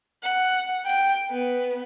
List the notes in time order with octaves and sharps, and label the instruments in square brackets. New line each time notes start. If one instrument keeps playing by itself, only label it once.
[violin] F#5
G5
B3